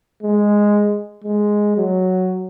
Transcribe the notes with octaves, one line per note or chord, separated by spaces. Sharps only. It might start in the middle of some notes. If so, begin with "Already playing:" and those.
G#3
G#3
F#3